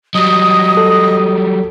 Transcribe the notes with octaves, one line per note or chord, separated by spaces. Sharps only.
F#3 G3 D#5 D#6
A4